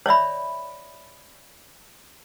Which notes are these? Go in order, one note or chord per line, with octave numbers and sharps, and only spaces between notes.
C#5 D5 E5 B5